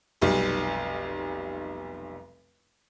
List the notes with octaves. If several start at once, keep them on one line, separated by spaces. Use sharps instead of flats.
F1 B1 G3